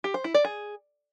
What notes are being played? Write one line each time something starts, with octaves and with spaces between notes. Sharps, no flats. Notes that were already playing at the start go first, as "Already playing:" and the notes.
G4
C5
E4
D5
G#4